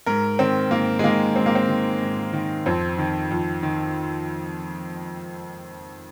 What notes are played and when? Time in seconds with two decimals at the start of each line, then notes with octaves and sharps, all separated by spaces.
0.06 G#2 A#4
0.39 D#3 C4
0.71 G#2 A#3
0.99 G#3
1.04 D#3 A#3
1.36 G#2 C4
1.46 A#3
1.55 C4
1.69 D#3
2.02 G#2
2.33 D#3
2.66 F2 C4
2.98 D#3
3.31 F2
3.63 D#3